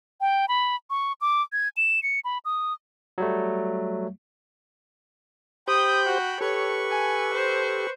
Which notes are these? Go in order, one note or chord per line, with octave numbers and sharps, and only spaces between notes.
G5
B5
C#6
D6
G#6
E7
C#7
B5
D#6
F#3 G3 A3
G4 C5 G5 B5 D#6 G6
F#4
G4 A4 B4 C#5 C#6
G#5
C5